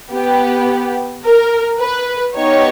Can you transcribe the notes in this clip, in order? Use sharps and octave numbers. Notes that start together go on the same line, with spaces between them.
B3 G4
A#4
B4
B3 D#4 G4 C#5